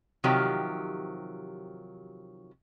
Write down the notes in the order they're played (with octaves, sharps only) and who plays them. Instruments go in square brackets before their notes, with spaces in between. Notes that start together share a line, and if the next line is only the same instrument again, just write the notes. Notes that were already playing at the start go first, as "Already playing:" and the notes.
[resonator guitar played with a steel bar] C3 D#3 F3 F#3 G4